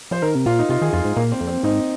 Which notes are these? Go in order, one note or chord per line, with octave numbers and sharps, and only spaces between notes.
F3 C5
D#3 A#4
C3
A#2 F4
D#4
C3 F4
D#3 G#4
F2 F4
G#2
A#2 A#3
C4
F2
C4
G#2 D#4